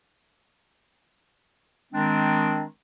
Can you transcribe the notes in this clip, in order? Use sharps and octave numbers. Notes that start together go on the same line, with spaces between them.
D#3 G#3 C4 D4